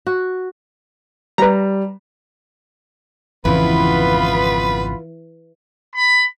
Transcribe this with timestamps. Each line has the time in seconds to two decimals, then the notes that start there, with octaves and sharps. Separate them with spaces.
0.07 F#4
1.38 G3 B4 A#5
3.45 G#1 F2 C#3 E3 B3 F4 B4 B5
5.95 B5